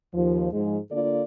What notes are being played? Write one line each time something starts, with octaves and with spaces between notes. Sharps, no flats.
D#2 F3
G#2 F3 G#3
D3 A#3 D4 F4 A4 D5